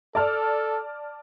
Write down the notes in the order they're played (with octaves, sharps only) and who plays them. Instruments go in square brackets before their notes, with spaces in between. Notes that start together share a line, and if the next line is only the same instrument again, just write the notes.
[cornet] A4 [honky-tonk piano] D5 A5 F6